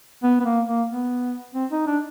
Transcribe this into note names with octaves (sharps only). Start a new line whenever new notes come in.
B3
B3
A#3
A#3
B3
C4
D#4
D4